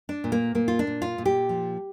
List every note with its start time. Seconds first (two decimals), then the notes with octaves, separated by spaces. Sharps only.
0.09 D4
0.24 A#2
0.32 A#3
0.55 A#2 A#3
0.68 F4
0.79 D4
0.87 A#2
1.02 F4
1.18 A#2
1.26 G4
1.49 F3